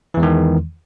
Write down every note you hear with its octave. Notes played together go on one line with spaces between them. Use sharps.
E2 D#3 E3 G#3